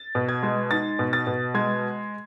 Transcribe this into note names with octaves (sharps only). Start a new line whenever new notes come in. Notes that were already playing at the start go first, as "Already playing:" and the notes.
Already playing: A6
B2
G#6
G#3
D#4 A6
B2
A6
B2
G#3 G#6